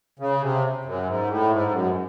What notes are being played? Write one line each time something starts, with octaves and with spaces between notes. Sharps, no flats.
C#3
C3
F#2
G#2
A2
G#2
F#2